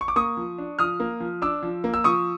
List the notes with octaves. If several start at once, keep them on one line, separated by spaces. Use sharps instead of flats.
C#6
D6
A#3 C#6 D#6
F3
D4
F3 D#6 F6
A#3
F3
D4 D6 E6
F3
A#3
E6
F3 C#6 D#6